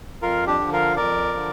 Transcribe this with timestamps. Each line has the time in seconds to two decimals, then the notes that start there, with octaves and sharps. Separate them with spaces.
0.22 F2 F4 A#4
0.47 D4 G4
0.60 D3 F3
0.73 F4 A#4
0.96 F2 A#4 D5
1.34 D3 F3